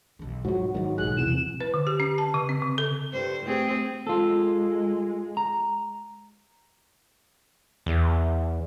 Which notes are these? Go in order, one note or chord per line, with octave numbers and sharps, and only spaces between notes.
B1 D#3
G#2 F3 F#3 C4 E4 F#4
G#2 D#3 F#3 A3 C4
B1 B2 G#4 F#6
E2 C3 E3 E7
B4
D3
G4
C#4
A5
C#3
C4
C#3
A4
G2 C5
A3 C4 G#4
G#3 F4 A4
A#5
E2